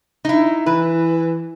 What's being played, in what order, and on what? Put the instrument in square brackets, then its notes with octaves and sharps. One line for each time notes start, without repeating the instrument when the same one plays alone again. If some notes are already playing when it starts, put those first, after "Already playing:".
[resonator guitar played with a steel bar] D#4 E4
[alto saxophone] E3 [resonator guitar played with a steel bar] B4